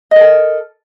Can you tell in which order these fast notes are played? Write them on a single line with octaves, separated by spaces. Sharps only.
D#5 A#4 A4